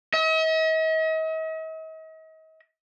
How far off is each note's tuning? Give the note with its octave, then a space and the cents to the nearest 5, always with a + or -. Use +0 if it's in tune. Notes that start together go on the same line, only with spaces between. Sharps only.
D#5 +45